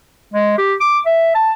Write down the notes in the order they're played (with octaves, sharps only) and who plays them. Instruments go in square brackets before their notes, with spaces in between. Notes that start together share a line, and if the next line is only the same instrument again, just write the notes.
[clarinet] G#3
G4
D6
E5
A5